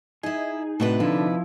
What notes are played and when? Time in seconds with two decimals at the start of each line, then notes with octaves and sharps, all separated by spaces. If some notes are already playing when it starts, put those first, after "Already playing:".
0.23 D#4 E4 G#4 D#5
0.80 A2 C3 D4 F#4 B4 D#5
1.00 D3 F3 E4